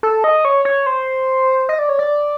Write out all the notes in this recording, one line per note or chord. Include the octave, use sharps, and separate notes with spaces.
A4
D#5
C#5
C#5
C5
D#5
D5
C#5
D5